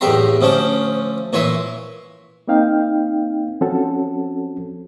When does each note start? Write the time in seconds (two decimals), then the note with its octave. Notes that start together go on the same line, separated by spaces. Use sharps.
0.01 E2 A2 G4 E5 A#5 C6
0.41 D2 F3 C#4 D4 C5
1.33 A#2 E3 C#5 E5 C6
2.48 A#3 C4 D#4 F5 G5
3.61 F3 C4 C#4 F#4 A4